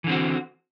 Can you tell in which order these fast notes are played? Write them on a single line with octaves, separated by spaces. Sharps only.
E3 D3 C4 F#4